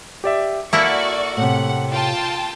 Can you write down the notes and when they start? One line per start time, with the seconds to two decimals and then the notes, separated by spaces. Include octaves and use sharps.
0.24 G4 D5 E5
0.73 A#3 E4 F#4 A4 D5 E5 C#6 E6
1.37 A2 C3 F#5
1.90 F4 G5 A5